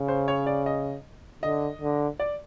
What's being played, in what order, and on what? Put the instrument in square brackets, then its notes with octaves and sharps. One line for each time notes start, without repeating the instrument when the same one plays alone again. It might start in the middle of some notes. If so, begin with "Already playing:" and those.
Already playing: [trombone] C#3
[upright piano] C5
C#5
D5
D#5
[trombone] D3 [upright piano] D#5
[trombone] D3
[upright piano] D5